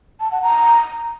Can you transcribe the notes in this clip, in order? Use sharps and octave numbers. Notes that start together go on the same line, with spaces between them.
A5
F#5
A#5